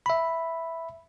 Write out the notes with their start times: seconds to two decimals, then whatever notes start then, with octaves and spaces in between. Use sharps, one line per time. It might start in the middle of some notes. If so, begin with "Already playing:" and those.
0.06 E5 B5